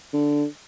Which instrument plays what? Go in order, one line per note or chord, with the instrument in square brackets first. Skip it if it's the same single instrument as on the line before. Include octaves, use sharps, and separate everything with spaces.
[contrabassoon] D3